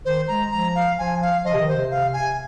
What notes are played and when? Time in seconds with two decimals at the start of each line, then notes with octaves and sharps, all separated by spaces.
0.05 D#3 C5
0.28 G#3 A#5
0.51 F3 A#5
0.75 F5
0.98 F3 G#5
1.22 F5
1.45 F3 D#5
1.54 C3
1.60 D#3
1.68 C5
1.76 C3
1.91 F5
2.13 G#5